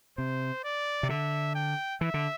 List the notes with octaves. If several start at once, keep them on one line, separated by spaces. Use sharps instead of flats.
C3 C5
D5
C3
D3 E5
G5
E3 E5
D3